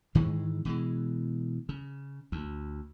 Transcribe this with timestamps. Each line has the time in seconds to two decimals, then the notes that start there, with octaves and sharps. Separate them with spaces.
0.15 G#2 D#3 E3 G#3
0.65 B2 E3 G#3
1.69 C#3
2.32 D2